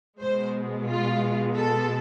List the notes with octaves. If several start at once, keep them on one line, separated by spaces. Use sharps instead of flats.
B2 G#3 C5
F4
A4